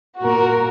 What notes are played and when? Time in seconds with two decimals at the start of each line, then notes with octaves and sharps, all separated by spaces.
0.22 A#2 F#4 A#4